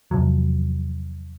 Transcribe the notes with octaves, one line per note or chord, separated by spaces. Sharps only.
E2 C3 F3 F#3